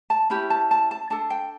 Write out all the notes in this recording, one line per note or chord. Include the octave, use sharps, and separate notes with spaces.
A5
C#4 E4 G4 B5
A5
A5
A5
D4 A4 A5
G5